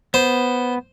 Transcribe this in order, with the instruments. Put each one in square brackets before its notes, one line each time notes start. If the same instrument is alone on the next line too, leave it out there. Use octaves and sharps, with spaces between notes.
[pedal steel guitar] B3 [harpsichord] C5